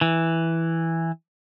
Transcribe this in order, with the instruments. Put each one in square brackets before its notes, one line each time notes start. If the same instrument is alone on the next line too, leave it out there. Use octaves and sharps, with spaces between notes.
[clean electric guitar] E3